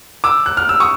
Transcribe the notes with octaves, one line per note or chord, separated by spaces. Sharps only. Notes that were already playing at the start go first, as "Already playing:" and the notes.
D6 E6
F#6
F6
E6
C#6 D#6